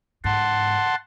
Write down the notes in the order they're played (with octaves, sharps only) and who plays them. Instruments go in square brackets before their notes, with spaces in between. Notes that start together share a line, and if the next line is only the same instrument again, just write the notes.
[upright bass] G#2 [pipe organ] F#5 A5 C6